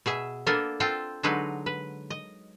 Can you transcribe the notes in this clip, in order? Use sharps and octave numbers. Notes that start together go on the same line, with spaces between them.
B2 G#4 E5
A#3 B3 D4 A4 A#4
C4 F4 A4 G5
D3 F#3 G#3 D#4 B4
B4
D#5